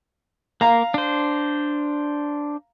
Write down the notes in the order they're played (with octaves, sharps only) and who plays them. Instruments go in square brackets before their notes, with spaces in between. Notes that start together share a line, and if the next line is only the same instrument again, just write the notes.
[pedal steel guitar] A#3 [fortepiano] F5 A#5
[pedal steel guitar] D4 C5